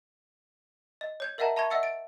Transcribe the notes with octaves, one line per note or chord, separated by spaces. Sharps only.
D#5
C#5 G6 G#6
A#4 D#5 E5 F#5 A5 A#5
E5 A5 B5 C#6 G#6
D#5 E5 F#5 E6 A6 C#7
A6 D7